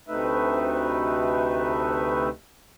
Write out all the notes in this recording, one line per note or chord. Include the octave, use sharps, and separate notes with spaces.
D2 C3 A3 D#4 B4 E5